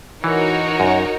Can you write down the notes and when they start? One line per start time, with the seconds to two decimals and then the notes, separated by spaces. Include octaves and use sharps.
0.24 E3 D#4 F#4 A#4 C#5
0.80 F#2